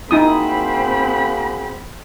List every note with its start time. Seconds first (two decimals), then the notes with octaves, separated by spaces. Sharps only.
0.11 A#3 C4 D#4 E4 F#4 G#4 B5 D#6